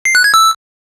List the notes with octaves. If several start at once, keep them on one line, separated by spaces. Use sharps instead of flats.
C7
F#6
G#6
E6